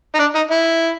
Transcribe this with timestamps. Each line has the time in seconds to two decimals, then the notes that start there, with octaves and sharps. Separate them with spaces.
0.15 D#4
0.19 D4
0.35 D#4
0.51 E4